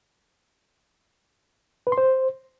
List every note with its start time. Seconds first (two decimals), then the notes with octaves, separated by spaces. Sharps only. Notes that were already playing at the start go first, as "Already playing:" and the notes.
1.87 B4
1.92 C6
1.98 C5